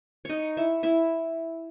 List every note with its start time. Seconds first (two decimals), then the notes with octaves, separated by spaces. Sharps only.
0.25 D#4 C#5 D#5
0.57 E4 E5
0.83 E4 E5